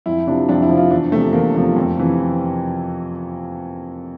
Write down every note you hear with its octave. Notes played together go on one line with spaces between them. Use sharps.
F2 E4
C3 F3 D4
F2 D4
E4
C3 F3
F4
E2 D4
C3 F3 A3
E2 A#3
C3 F3
F2
C3 E3